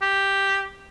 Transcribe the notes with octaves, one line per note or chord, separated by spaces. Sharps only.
G4